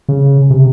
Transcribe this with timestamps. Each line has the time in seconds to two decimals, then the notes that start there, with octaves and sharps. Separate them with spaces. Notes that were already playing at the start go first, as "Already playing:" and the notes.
0.09 C#3
0.51 C3